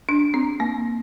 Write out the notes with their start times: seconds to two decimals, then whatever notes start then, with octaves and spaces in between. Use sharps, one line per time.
0.09 D4
0.34 C4
0.60 A#3